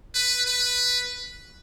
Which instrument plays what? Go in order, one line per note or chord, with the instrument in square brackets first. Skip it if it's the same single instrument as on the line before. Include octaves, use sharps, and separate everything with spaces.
[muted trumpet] B4
B4